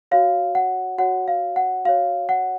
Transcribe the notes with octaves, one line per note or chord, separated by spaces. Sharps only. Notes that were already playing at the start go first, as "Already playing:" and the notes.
F#4 C#5 F5
F#5
F#4 C#5 F#5
F5
F#5
F#4 C#5 F5
F#5